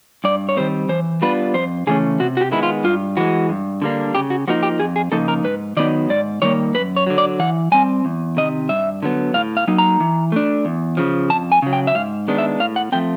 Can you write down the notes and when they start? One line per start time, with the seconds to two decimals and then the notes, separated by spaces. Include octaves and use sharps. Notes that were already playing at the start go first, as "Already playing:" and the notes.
0.24 G2 D5
0.49 C#5
0.57 D#3 G3 C4 C5
0.89 E3 C5
1.22 G3 B3 D4 F4 B4
1.54 F2 C5
1.87 C#3 E3 A3 C#4 G#4
2.20 C3 F#4
2.37 F#4
2.41 G4
2.51 D#3 G#3 B3 E4
2.63 F4
2.84 G2 F4
3.17 E3 G#3 F#4
3.49 G2
3.82 D3 G3 A#3 D4
4.15 C#3 G4
4.30 F#4
4.48 F3 A#3 D#4 F#4
4.63 G4
4.80 F2 G#4
4.96 G#4
5.12 C#3 F3 A#3 D#4 A4
5.28 A#4
5.44 G#2 B4
5.77 D#3 F#3 B3 D#4 D5
6.10 G#2 D5
6.42 D#3 G3 A#3 C#5
6.75 F#2 B4
6.96 C#5
7.07 D3 F#3
7.18 D5
7.40 E3 F#5
7.72 G3 C4 G#5
8.05 E2
8.37 C3 D#3 D#5
8.69 G2 E5
9.03 D3 F#3 B3
9.34 A2 F5
9.57 F5
9.68 F#3 A#3 D#4
9.78 A#5
10.00 E3
10.32 A3 D4
10.65 E2
10.97 C#3 F3
11.30 F2 A5
11.52 G#5
11.62 C#3 F#3
11.73 G5
11.87 E5
11.95 G#2 F5
12.28 D#3 G#3 B3 D4
12.38 E5
12.60 A2 F5
12.76 F#5
12.92 F3 A3 C4 G5